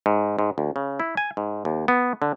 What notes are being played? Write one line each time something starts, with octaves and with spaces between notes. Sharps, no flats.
G#2
G#2
D2
C#3
E4
G#5
G#2
D#2
B3
D3